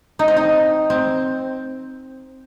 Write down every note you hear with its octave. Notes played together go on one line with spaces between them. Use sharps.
D#4
C4
D#4
C4